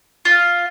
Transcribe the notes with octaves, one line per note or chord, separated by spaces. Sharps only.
F4